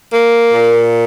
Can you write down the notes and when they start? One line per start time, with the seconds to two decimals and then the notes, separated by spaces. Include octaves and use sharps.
0.13 A#3
0.54 A#2